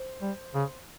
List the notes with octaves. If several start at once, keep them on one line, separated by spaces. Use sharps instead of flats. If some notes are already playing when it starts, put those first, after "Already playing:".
Already playing: C5
G3
C#3